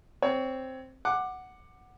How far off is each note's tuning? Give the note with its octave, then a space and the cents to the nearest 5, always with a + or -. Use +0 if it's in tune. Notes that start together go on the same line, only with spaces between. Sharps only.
C4 +0 C#5 +20
F#5 +0 D6 +15